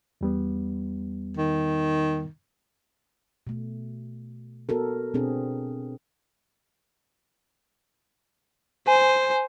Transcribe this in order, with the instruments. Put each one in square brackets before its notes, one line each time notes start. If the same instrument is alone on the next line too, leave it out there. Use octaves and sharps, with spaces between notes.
[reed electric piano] E2 G3 B3
[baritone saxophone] D#3
[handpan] B2 A3
B3 F#4 A4 A#4
B2 C4 D4 G#4
[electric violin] C5 [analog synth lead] G#5